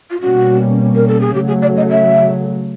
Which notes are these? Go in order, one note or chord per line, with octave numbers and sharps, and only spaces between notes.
F4
B2 G3 A#3 C#4 F#4
A#4
A4
G#4
C#3 F#3 A3 G4
G#4
D5
D#5
E5